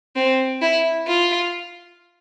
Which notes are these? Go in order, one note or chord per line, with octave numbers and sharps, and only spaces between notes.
C4
E4
F4